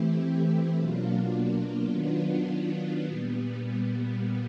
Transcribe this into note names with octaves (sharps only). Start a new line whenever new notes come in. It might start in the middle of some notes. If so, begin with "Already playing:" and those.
Already playing: E3 A3 C4 E4 G4
B2 F#3 A#3 D4 F4
D#3 F#3 B3 D4 F4
A#2 G3 B3